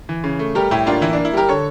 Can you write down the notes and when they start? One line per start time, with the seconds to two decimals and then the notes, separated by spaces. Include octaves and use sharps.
0.09 E3
0.24 C#3
0.39 A3
0.55 G3 G4 A#4
0.71 A2 E4 G4
0.86 A#3 D4 F4
1.01 E3 E4
1.13 A#3 D4
1.25 E4
1.33 G3 G4 A#4
1.48 D3 A4 C#5